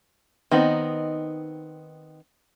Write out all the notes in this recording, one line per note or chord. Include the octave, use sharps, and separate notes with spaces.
D#3 B3 C4 D#4